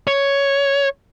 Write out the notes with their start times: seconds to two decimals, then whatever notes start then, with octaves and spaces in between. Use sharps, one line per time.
0.07 C#5